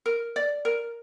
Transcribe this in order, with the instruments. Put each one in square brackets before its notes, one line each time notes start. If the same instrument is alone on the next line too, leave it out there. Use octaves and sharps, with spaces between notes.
[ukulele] A#4
D5
A#4